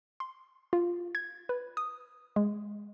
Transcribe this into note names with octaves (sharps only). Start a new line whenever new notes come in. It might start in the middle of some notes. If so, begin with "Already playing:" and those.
C6
F4
G#6
B4
D#6
G#3